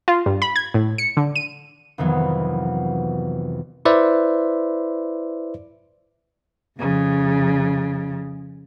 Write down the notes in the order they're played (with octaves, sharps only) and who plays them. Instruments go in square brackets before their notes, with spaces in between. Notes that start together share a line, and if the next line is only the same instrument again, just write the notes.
[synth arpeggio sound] F4
G2
B5
G#6
A2
C#7
D3
D#7
[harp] C2 F2 D#3 E3 F#3 B3
[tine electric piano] E4 B4 C5 D5 E5
[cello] F2 C#3